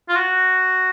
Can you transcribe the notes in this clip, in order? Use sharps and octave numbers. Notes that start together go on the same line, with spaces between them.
F4
F#4